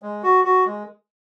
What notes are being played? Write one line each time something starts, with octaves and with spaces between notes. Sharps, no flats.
G#3
F#4
F#4
G#3